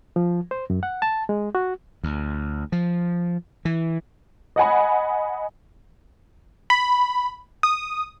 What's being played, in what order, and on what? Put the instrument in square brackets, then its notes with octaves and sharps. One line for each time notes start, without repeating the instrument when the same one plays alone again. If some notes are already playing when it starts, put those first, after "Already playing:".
[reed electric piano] F3
C5
F#2
F#5
A5
G#3
F#4
[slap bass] D2
F3
E3
[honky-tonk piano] D#5 F#5 G#5 B5
[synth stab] B5
D#6